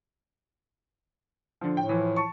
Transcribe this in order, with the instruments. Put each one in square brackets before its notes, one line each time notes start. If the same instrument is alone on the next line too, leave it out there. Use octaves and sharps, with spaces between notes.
[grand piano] D3 F3
[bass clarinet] A2 [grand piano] G5
[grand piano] E3 F3
A5 C#6